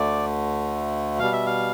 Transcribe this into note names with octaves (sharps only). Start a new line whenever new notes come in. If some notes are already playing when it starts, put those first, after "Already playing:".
Already playing: D2 D3 A3 D5
B2 G3 F5
E5
F5